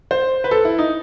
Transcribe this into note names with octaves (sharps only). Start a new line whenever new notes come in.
C5
B4
A4
E4
D#4